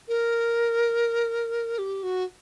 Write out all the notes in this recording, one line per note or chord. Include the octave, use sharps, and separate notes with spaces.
A#4
G4
F#4